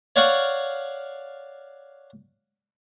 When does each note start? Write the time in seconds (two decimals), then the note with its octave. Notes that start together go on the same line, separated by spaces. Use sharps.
0.16 C#5 D5 F5 F#5 C#6